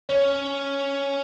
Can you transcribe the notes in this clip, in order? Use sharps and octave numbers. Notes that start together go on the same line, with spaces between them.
C#4 C#5